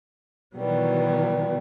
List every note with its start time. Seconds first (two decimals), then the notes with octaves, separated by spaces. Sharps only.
0.56 B2 D#3 E3 F#3 G3 B3